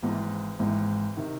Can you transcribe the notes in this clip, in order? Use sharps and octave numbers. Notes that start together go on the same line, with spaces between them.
G#1 G#2 E3
G#1 G#2 E3
C3 D#3